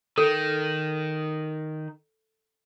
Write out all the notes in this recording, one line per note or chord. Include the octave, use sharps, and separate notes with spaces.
D#3 A4